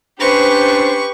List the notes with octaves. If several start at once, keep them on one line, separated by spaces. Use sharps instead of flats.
C#4 D4 G4 B4 C5 C#6